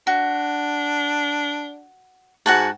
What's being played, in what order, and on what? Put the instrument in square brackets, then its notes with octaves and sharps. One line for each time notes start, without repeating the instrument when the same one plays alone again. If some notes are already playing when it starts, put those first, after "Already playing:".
[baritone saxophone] D4 [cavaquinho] F#4
[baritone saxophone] G#2 [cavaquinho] F#4 F#5 A5